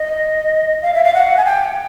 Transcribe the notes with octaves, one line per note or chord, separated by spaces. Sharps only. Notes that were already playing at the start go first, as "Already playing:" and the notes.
Already playing: D#5
F5
E5
F5
F#5
G#5
G5